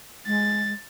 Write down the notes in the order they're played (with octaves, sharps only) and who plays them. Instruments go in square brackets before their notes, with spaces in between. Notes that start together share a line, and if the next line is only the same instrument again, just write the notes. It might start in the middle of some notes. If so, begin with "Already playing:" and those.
[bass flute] G#3 [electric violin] A6